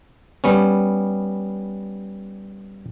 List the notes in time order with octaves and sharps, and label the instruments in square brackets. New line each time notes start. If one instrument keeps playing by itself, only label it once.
[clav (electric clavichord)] G3 B3 C#4